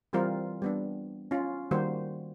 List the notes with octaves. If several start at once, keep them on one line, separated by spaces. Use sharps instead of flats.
E3 G3 C4 F4 A#4 C5
G3 B3 D4
C#4 F4
D#3 G3 A#3 F#4 C5